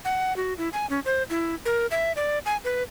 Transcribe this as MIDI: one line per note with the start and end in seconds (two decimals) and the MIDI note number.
0.05 0.35 78
0.36 0.54 66
0.58 0.69 64
0.73 0.86 80
0.90 1.00 61
1.05 1.23 72
1.30 1.55 64
1.65 1.86 70
1.91 2.12 76
2.16 2.39 74
2.46 2.57 80
2.64 2.83 71